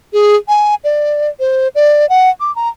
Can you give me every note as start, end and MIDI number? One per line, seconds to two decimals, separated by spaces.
0.13 0.36 68
0.48 0.75 80
0.84 1.30 74
1.40 1.68 72
1.75 2.08 74
2.09 2.30 78
2.40 2.54 86
2.56 2.69 82